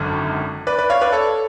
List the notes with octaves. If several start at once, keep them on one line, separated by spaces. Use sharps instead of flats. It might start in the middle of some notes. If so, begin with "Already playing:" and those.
Already playing: G#1 F#2 D3
B4 D5
B4 D5
C#5 F5
B4 D5
A4 C#5